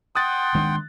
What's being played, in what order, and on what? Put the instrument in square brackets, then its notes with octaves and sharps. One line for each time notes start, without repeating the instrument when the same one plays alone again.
[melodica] F#5 G5 [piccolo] C6 [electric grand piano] D#6 F#6 A6
[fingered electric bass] D#3 G#3 D4